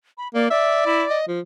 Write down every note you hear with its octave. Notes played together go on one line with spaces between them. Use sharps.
B5
A#3 D5
D5 E5
E4
D#5
F3